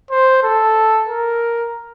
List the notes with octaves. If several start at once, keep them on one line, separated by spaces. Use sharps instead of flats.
C5
A4
A#4